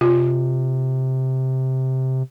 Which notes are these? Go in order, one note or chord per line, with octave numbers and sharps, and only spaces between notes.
C3 F4